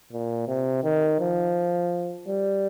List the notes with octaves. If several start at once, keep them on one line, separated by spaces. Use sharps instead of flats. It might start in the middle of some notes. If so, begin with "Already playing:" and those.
A#2
C3
D#3
F3
G3